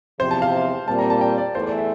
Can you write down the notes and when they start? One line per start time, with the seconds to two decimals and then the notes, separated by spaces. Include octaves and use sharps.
0.20 E2 C3 F3 C5
0.31 A5
0.42 F5
0.87 A#2 G3 C4 A5
0.99 A#5
1.10 A5
1.21 G5
1.38 D5
1.55 E2 E3 A3 E4 C5
1.66 D5
1.78 E5